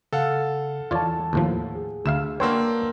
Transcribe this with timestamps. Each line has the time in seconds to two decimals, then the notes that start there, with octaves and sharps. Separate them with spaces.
0.13 C#3 A4 F5 F#5
0.91 E2 E3 F4 C#5 D5 A5
1.33 D#2 A2 F3
1.75 G#4
2.06 D2 E5 F5 E7
2.40 A#3 D4 F#4 B4 C#5 G5 C6 E6